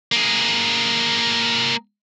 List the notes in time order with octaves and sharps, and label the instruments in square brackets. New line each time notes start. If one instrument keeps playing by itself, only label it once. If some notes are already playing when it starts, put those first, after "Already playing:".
[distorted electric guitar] A#3 G#4